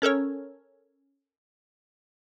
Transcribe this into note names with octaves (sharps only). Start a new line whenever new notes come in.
C#4 A4 A#4 C#5